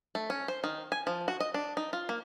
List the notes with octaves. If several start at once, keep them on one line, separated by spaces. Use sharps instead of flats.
A3
C#4
C5
D#3
G#5
F3
F#4
D#5
D4
D#4
F4
A#3